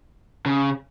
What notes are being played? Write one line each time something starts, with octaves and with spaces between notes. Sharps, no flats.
C#3